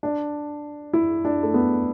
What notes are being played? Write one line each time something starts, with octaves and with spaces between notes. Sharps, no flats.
D4
E4
D4
A3
B3